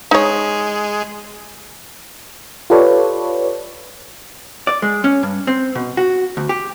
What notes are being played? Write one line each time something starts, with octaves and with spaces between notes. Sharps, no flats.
G#3 D#4 G#4 C#5
F4 G4 A4 B4 C#5 D5
D5
G#3
C#4
G2
C4
B2
F#4
D2
G4